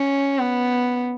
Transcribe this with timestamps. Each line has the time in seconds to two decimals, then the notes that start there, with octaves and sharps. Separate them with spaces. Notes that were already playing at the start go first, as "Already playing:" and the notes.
Already playing: C#4
0.39 B3